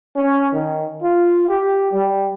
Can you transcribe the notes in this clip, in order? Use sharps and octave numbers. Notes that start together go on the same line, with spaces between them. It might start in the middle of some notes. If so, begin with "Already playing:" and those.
C#4
D#3
F4
G4
G3